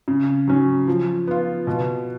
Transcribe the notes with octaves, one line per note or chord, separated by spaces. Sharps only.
C#3
F#3 C#4
F3
B3 F4
B2